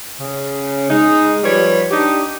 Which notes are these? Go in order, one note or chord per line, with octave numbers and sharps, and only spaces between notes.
C#3
G#3 D#4
F3 G3 B4 C#5
D4 D#4 G4